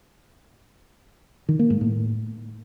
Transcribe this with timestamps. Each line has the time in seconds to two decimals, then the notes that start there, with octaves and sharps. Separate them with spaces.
1.49 D#3
1.59 A#3
1.70 G#2
1.81 A2